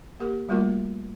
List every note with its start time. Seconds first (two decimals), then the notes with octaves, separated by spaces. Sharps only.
0.20 A#3 G4 A#4
0.49 G3 A3 A#3 F4 F#4 A#4